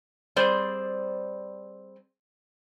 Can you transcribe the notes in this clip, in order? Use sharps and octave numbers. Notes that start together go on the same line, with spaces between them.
G3 C4 G#4 C5 D5